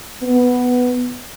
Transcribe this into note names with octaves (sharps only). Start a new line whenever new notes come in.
B3